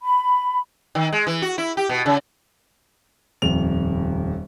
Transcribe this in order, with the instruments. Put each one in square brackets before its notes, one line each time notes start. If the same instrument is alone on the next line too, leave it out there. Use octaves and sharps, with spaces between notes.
[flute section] B5
[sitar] D#3
G#3
E3
F#4
E4
G4
B2
C#3
[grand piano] D#1 F2 F7